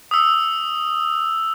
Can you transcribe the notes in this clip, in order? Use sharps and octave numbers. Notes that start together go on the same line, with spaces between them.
D#6 E6